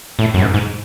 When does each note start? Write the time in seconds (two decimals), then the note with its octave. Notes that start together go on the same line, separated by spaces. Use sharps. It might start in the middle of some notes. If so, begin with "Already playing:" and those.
0.19 A2
0.34 F#2
0.42 G#2
0.54 G#2